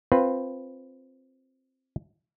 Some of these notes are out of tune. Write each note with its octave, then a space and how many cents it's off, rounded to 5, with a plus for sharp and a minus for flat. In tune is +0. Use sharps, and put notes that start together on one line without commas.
C4 +5 F4 +0 B4 +0